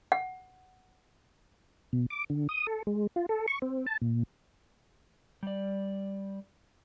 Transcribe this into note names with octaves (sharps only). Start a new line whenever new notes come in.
F#5
B2
D6
D3
D#6
A4
G#3
F4
A4
C#6
C4
A5
A#2
G3 D5